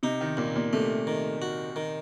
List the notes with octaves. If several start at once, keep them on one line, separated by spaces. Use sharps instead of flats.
C3 D#4
D#3
D#2 A#2
A#2
C3 A3
D#3
F#4
D#3